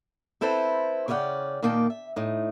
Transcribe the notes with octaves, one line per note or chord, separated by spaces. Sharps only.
C4 E4 A4 B4 C5
C#3 C#4 D5 E5 F#5 G5
A#2 D#3 A#3 G5 A5
E5
A2 D#4